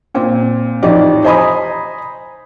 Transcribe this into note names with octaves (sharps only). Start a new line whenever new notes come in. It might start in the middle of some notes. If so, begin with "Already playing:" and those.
A#2 C4
A1 F2 D#4 G4 D5
C5 D#5 G#5 A#5 B5 D#6